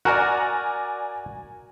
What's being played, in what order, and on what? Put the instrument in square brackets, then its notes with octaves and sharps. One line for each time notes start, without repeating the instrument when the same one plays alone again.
[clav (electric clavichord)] F#4 A#4 [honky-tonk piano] D5 G#5 A#5